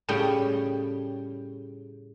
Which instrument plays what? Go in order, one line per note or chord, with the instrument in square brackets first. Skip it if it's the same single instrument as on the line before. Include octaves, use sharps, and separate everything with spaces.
[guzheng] A2 C#3 G3 G#4 G5